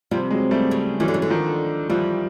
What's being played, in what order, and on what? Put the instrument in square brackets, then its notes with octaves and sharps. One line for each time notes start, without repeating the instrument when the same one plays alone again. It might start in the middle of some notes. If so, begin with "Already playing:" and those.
[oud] C3 [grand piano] F3 G3
[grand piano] F#3 G#3
G3 A3
[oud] C#3
[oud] D#3 [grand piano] E3 F#3
[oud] D3
C#3
D3
[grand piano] D#3 F3
[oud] E3 [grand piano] F3 G3